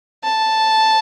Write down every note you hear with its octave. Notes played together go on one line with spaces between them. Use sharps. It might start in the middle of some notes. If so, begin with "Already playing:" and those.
A5